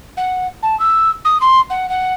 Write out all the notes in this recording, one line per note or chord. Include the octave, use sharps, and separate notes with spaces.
F#5
A5
E6
D#6
C6
F#5
F#5